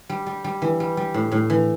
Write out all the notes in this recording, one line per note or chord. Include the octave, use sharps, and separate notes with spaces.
G3
G3
G3
E3
G3
G3
A2
A2
E3